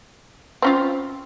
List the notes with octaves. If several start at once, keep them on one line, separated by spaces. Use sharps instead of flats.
C4 C#4 F4